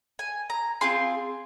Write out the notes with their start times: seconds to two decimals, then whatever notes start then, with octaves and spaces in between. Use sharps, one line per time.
0.19 G#5
0.50 A#5
0.81 C4 F4 G#4 C6